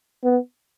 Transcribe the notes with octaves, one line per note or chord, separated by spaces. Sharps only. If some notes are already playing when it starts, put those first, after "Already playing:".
B3